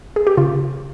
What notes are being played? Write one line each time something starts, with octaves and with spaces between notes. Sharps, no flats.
G#4
G4
C#3 F4